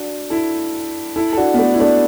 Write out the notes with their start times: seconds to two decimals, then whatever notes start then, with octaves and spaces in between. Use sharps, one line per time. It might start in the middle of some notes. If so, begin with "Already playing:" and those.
Already playing: D4 F#4
0.30 E4 A4
1.16 E4 A4
1.33 A4
1.37 D4 F#4
1.54 B3
1.58 A3 D4
1.74 E4
1.80 A3 D4